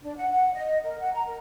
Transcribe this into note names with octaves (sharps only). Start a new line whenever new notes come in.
D4
F#5
F#5
D#5
A#4
F#5
A#5
A#4